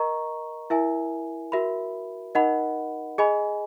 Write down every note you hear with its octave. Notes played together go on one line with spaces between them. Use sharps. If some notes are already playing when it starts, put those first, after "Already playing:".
Already playing: A#4 D#5 A#5 C#6
E4 A#4 E5 G#5
F#4 A#4 E5 B5
D#4 A#4 D#5 F#5 B5
G#4 D#5 G#5 B5